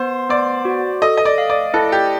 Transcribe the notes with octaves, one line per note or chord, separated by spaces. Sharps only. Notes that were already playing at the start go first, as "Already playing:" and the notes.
Already playing: B3 C5
B3 D5
F#4
A4 D#5
D#5
D5
F5
D5
E4 A4
G4